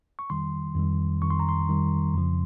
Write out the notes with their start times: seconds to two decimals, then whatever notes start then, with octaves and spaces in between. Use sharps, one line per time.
0.19 C#6
0.30 F2 D#3 G3 C6
0.75 F2 D#3 G3
1.22 F2 D#3 G3 C#6
1.31 C6
1.39 A#5
1.49 C6
1.69 F2 D#3 G3
2.14 F2 C#3 F3